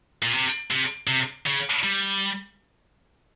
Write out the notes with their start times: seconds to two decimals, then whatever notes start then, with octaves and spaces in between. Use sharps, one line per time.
0.23 A#2
0.33 C3
0.71 C3
1.07 C3
1.46 C#3
1.83 G3